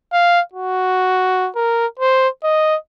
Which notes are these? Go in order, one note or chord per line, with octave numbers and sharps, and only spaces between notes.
F5
F#4
A#4
C5
D#5